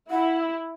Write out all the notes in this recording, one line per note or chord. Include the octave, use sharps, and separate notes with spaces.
E4 F#5